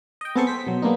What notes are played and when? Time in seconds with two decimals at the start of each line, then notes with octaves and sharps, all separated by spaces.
0.21 D#5 G5
0.35 B3 C4 G#4 A4 C5 C#6
0.47 C5 B6
0.67 B2 F#3
0.82 G#3 A#3 B3 D4 D#4